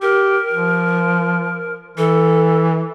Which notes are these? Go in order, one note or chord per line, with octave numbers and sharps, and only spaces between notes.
G4 A#4
F3
E3 A4